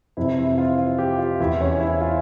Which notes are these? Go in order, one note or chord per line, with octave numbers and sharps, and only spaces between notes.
F2 C3 E3 E4
E4
F4
F4
G4
F4
E2 E3 E4
C#4
E4
F4